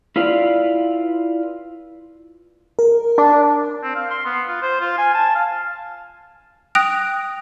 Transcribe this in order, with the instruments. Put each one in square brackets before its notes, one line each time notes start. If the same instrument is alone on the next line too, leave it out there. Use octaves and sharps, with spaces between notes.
[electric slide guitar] E4 F4 B4 D5 F5
[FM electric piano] A#4
[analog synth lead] D4
[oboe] C4
F5
C6
B3
F4
C5
F4
G#5
A5
F5
[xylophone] G5 D#6 F#6 A#6 D7 F7